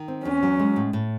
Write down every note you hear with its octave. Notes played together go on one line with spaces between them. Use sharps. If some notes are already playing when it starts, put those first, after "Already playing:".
Already playing: D#3
C4
E2 C#4
F#3
G#3
A2
A2